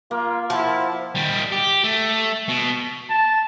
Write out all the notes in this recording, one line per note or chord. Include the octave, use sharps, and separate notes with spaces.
A#3 F4 D6 F6
F3 E4 F#5
D#3 G3
G4
A3
B2
A5